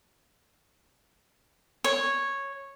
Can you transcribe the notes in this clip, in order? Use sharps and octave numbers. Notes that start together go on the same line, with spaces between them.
C#5